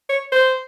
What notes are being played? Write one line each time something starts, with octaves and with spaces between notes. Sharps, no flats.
C#5
C5